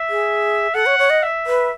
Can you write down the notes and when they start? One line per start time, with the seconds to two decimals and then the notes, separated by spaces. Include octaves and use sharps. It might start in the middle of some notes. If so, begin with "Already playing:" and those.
Already playing: E5
0.09 G#4
0.74 A4 F#5
0.86 C#5
0.99 C#5
1.10 D#5
1.23 E5
1.47 B4